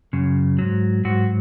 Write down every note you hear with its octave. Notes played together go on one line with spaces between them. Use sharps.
F#2 C#3
G#2 F#3
G#2 F#3 F#4